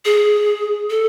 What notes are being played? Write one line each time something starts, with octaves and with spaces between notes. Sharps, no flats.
G#4
A4